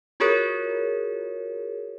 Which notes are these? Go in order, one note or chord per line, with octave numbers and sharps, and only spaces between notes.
F4 F#4 G#4 A#4 C#5